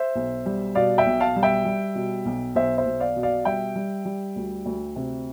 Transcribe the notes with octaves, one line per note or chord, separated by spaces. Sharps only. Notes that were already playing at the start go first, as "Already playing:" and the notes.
Already playing: C5 E5
B1
G3
B2 D5 F5
E5 G5
B1
F5 A5
G3
E5 G5
G3
B2
B1
B1 C5 E5
C5 E5
B1
D5 F5
B2
D5 F5
G3 E5 G5
G3
G3
D2
D2
C3